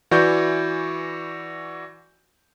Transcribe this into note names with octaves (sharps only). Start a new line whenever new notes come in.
E3 F#4 D5 C#6 G6